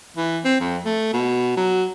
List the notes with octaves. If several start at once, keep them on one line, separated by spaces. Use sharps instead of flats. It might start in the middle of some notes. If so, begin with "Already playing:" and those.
E3
C4
F2
A3
B2
F#3